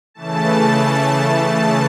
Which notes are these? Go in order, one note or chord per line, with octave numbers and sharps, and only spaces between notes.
C#3 E3 A3 A5
A5